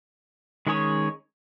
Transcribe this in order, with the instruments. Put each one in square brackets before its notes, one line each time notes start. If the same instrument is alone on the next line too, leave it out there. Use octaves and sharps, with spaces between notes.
[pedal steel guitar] D#3 G#3 C#4 G#4 C#5